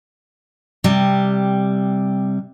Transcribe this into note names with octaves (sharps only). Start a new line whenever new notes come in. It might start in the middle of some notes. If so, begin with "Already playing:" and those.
C3 G3